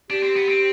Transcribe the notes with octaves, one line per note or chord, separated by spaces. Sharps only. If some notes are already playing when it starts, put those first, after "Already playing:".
D4 G4
C4
B3
C4